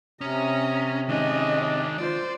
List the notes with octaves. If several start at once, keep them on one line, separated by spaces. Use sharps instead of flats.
C3 C#4 A#5 D#6
D#3 G#3 C#4 D4 D#5
F4 C5 D5